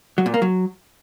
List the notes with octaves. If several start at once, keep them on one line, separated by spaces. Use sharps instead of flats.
F#3
A#2
A#3
F#3